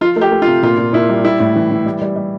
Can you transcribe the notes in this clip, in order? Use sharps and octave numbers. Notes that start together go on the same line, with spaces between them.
F3 F4
A3
G4
A3
F4
C3
A#2 F4
A#2
A#2 E4
G3
G3 E4
A2
E3
E3
G3
G3
G3